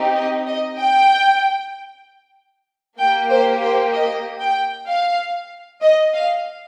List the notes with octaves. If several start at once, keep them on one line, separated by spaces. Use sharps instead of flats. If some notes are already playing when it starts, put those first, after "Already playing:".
Already playing: C4 D#4 G4
D#5
D#5
G5
A#3 G4 G5
C5
C5
D#5
G5
F5
D#5
F5